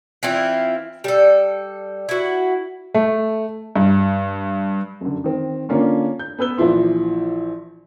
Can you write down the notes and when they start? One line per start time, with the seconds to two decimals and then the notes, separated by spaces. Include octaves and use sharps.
0.23 E3 C4 E4 F4
1.04 G3 A4
2.09 E4 F#4
2.95 A3
3.76 G2
5.01 F#2 D3
5.24 D#3 C4
5.69 D3 A#3 C#4 D4 F4 A#4
6.19 G6
6.39 B3 B4 E6 G7
6.58 A#1 E3 F3 E4 C6